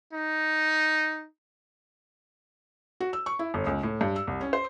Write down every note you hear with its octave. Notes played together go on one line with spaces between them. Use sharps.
D#4
F#4
E6
C#6
E4
G1
C#2
A2
G2
E6
C2
C#4
C5